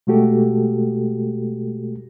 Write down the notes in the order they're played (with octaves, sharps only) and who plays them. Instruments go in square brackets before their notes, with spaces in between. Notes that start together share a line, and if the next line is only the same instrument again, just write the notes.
[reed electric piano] B2 G#3 A3 F#4 G4 A4